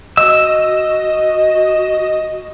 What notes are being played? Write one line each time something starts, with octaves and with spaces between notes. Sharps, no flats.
F#4 D#5 E6